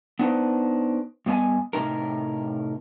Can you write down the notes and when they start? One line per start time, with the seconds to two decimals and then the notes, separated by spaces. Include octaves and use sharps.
0.19 B3 D4 D#4 B4 C5
1.26 G2 B3 D#5 G#5
1.73 A2 C3 D#4 A#4